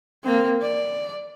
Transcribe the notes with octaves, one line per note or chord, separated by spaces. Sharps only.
A#3 C4
D5